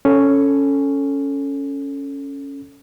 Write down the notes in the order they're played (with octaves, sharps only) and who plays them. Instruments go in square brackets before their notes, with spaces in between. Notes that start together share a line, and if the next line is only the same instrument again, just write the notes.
[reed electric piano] C#4 A4